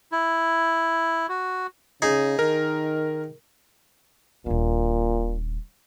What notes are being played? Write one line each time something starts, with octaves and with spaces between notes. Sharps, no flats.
E4
F#4
C#3 D#4 G#4
D#3 A#4
D#1 A#2 D4